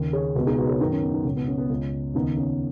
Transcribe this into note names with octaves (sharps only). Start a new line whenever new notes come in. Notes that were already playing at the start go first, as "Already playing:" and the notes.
Already playing: D#2 C#3
G#4 C#5
C#2 B2 F#4 B4
D#4 G#4
F#4 B4
G#4 C#5
F#2 D#3 B3 D#4
C#4
B3
B3 D#4
C#2 B2 C#4
B3
C#4
B3
C#2 C#3 C#4
D#2 C#3 B3 D#4
C#4